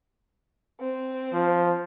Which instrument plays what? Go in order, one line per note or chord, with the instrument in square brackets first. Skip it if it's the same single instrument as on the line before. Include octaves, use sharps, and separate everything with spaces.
[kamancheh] C4
[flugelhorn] F3